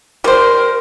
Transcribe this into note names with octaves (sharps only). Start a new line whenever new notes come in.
G3 A#4 C5